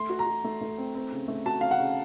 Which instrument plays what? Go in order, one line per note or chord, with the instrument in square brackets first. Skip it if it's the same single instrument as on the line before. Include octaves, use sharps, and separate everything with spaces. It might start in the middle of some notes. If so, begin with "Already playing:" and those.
Already playing: [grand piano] A3 [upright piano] C6
[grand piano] F#4
[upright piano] A#5
[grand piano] F#4
A3
A3
C4
C4
C#3
A3
[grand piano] F#4 [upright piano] A5
[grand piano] C4 [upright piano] F5
[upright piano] F#5
[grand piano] C#3